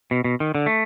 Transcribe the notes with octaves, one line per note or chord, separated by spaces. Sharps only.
B2
B2
D#3
D3
A3